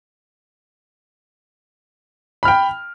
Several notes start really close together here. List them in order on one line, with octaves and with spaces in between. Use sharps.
B5 F6 G5